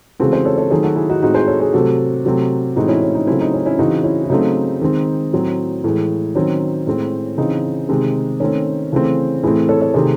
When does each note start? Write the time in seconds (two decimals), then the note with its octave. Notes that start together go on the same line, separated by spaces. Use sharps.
0.19 C#3 E3 G#3 C4 F#4 A4
0.32 G#4 C5
0.45 A4 C#5
0.57 A4 C#5
0.71 D#3 F#3 A3 G#4 C5
0.83 F#4 A4
0.96 E4 G#4
1.09 D#4 F#4
1.22 A2 G#3 C4 D#4 F#4
1.34 G#4 C5
1.47 A4 C#5
1.60 G#4 C5
1.73 C3 F#3 A3 C4 F#4 A4
2.25 C3 F#3 A3 C4
2.76 A2 E3 G#3 C4 D#4 F#4
2.88 C#4 E4
3.02 C#4
3.15 D#4
3.27 C#3 F#3 A3 C4 C#4 E4
3.41 D#4
3.54 C#4
3.66 C#4 E4
3.79 C#3 E3 C4 D#4 F#4
4.04 C#4 E4
4.24 E4
4.30 C#3 F#3 A3 C4 D#4
4.81 D#3 G#3 C4
5.33 A2 F#3 C4
5.84 A2 E3 G#3
6.35 D#3 F#3 C4 C#4
6.87 A2 G#3 C4
7.38 C#3 E3 C4 D#4
7.89 C3 D#3 G#3 C4
8.40 D#3 A3 C4 C#4
8.92 C#3 E3 A3 C4
9.43 A2 E3 A3 C4 E4 G#4
9.69 A4 C#5
9.81 A4 C#5
9.94 C3 D#3 A3 C4 G#4 C5